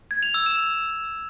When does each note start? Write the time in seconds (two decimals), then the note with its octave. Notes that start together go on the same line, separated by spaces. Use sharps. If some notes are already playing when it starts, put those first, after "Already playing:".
0.11 G#6
0.23 F7
0.34 E6
0.46 E7